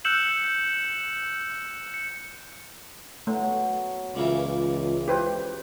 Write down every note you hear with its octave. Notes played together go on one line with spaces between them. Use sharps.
E6 F#6 G6 C#7 E7 F#7
C#7
B2 F#3 A3
C#2 A#2 C#3 E3
G4 B4 C5